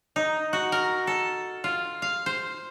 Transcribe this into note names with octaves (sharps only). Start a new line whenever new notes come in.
D#4
F#4
A#4
A4
F4
F5
C5